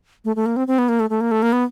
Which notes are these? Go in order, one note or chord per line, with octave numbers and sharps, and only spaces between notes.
A3
A3
A#3
C4
C4
B3
A#3
A3
A3
A#3
A3
A#3
B3